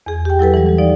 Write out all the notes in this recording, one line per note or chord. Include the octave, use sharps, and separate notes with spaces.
E2 G#4
G4 G5
F#3 E4 A4 B4
E3 G3
E3 G3
F3 D#4 D5